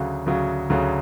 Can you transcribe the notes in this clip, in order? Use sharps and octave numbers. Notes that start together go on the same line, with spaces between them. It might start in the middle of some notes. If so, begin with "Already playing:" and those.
Already playing: D2 C#3 F#3
D2 C#3 F#3
D2 C#3 F#3